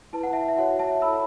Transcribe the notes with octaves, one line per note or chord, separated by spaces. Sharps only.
E4 B4 A5
F#5
E5 A5
E5
F#4 C#5 F#5
E5 A5
E4 A4 C#5 B5 E6